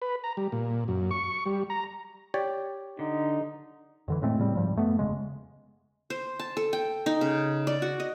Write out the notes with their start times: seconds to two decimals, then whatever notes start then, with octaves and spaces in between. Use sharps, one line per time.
0.02 B4
0.24 A#5
0.37 G3
0.52 A#2
0.88 F#2
1.11 C#6
1.46 G3
1.70 A#5
2.34 G4 C#5 D5
2.99 D3 D#4
4.08 F2 D3 E3
4.22 A2 G#3 A3 C4
4.38 A2 C#3 G3 C4
4.55 G#2 F3 G3
4.76 F#2 A3 B3
4.99 E1 C#3 G#3
6.10 C5
6.39 A5
6.57 A4
6.73 G5
7.06 D#4
7.21 C#3
7.67 D5
7.82 F#4
8.00 D#5